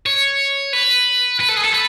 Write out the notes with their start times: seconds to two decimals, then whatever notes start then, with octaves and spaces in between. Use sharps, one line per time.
0.06 C#5
0.73 B4
1.40 B4
1.48 A4
1.56 G#4
1.64 A4
1.72 B4